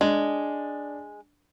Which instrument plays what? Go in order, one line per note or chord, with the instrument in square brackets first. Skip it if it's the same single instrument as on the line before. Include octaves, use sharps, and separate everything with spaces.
[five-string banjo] G#3 [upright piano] D4